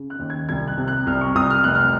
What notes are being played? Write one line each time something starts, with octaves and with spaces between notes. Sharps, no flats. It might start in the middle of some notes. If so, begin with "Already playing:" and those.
Already playing: C#3
F#6
D#2
G#6
C2 G#6
F#6
C3
F#6
C2 F6
C#6
C2 D#6
F6
F1 F#6
F6